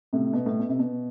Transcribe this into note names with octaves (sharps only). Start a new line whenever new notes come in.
A2 C3
B2
A2
B2
C3
B2